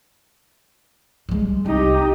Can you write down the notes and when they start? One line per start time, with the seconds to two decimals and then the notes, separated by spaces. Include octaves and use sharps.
1.29 G3 G#3
1.66 C2 D#4 G4